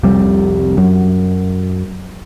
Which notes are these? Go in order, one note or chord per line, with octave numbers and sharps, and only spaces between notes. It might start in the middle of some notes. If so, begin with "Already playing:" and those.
C2 F2 C3 G3
F#2